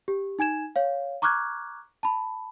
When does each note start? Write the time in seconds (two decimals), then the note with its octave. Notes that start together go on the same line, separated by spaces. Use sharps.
0.08 G4
0.39 D#4 G#5 G#6 E7
0.76 C#5 F5
1.22 A#5 C#6 D6 F6 F#6 G#6
2.03 A5 B5